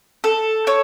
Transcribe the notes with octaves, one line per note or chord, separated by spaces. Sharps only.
A4
C#5